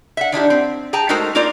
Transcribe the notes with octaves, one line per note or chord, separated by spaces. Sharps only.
E5 F#5
D#3 D4 E4 G4
C4
G#4 G5 A5 A#5
G#3 A3 D#4 F#4 A#4 C5
A#3 D#4 F4 A#4 C#5 D5